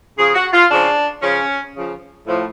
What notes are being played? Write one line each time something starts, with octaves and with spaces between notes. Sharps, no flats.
C#3 F3 G#4
F#4
F4
C#3 F3 D4
C#3 F3 C#4
C#3 F3
A2 F3